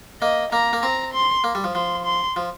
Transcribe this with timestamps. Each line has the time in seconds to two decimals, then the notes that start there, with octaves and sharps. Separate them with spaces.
0.22 A#3 D#5
0.52 A#3 A#5
0.73 A#3
0.82 C4 A#5
1.13 C6
1.44 A#3
1.55 G3
1.64 F3
1.74 F3 C6
2.05 C6
2.36 F3